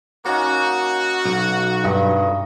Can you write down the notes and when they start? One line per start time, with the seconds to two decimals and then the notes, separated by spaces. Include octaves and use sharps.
0.24 A#3 C#4 D#4 F#4
1.25 B1
1.84 G2 D#5